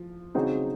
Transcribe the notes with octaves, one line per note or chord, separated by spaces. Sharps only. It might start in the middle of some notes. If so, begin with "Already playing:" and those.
Already playing: F3
C#3 F#3 C4 D#4 G#4